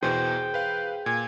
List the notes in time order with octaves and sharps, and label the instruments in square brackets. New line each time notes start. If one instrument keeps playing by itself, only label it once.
[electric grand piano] E2 B2 E3 [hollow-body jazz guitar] G#4 C5 [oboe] G5
[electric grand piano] B4 F5
[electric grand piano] A#2 [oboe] G#5